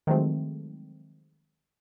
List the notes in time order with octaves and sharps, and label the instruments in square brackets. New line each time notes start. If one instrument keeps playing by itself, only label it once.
[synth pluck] D#3 F3 F#3 G#3 A3 C4